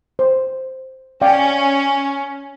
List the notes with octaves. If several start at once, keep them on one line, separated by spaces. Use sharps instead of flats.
C5
C#4 D5 F5 G5